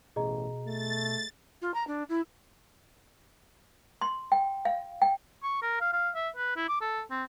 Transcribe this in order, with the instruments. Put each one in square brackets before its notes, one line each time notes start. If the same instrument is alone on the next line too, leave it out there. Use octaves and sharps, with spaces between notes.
[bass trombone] A1 [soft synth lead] B2 [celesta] G#4 D#5 A#5
[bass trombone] A3 [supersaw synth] A6
[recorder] F4
A#5
D4
E4
[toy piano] C6
G5
F5
G5
[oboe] C#6
A#4
F5
F5
E5
B4
E4
D6
A4
C4